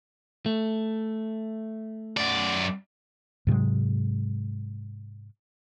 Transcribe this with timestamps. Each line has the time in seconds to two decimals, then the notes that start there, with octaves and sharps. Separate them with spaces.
0.46 A3
2.17 F#2 D5
3.47 G#2 C3 F#3 G#3